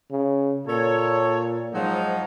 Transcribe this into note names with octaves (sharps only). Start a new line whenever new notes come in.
C#3
A#2 A4 C#5
G#2 F3 F#3 D#4